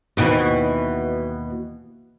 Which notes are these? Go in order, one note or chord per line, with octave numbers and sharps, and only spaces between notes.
D#2 B2 E3